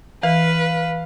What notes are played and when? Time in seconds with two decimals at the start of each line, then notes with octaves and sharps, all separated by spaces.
0.23 E3 B4 F5